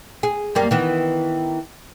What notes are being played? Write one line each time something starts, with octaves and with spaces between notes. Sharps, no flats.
G#4
F#2 G3 A#3
D#3 E3 B3